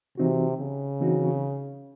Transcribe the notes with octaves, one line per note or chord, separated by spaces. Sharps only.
C3 E3 C4 D#4 F#4
C#3
E3 C4 D#4 F#4